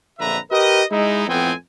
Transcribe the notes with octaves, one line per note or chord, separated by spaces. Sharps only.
A#1 F2 D3 B4 E5 A#5
G4 A#4 B4 D#5
G#3 D#4 E4
F2 A2 B3 C4 G5 G#5